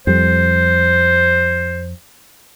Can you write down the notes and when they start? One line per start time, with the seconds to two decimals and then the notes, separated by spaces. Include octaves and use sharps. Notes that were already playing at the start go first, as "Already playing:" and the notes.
0.07 F2 G3 C5